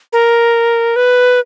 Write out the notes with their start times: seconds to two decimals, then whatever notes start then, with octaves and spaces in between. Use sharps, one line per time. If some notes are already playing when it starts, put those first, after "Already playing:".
0.13 A#4
0.96 B4